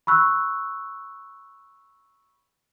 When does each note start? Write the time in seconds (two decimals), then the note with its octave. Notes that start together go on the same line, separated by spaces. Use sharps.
0.07 B5 C#6 E6 F#6